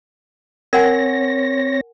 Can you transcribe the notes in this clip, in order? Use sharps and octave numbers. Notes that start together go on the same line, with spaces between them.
C4 A#4 C#5 F#5 G#5 A#6